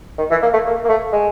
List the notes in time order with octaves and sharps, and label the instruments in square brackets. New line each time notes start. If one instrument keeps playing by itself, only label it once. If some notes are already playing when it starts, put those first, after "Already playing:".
[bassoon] D#3
E3
A#3
A3
A#3
A#3
A3
G#3